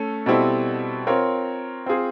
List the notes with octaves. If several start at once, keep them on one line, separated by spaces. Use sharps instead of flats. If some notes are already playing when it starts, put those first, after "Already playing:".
Already playing: A3 C#4 A4
B2 G3 C4 E4 A4
C4 F4 A#4 C#5
C4 F4 G#4 C5